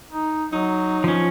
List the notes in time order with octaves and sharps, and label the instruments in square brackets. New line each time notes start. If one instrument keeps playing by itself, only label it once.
[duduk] D#4
[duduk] F#3 [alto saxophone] D#4
[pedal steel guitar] F3 C#4